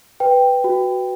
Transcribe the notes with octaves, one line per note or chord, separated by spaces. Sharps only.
B4 G5
F#4